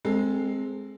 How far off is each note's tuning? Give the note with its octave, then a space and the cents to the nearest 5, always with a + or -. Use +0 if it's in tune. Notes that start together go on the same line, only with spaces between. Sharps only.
G#3 +0 C4 +0 A4 +25